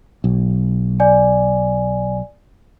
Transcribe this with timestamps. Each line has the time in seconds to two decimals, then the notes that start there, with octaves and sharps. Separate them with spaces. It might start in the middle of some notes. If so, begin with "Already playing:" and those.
0.24 B1
1.00 D5 G#5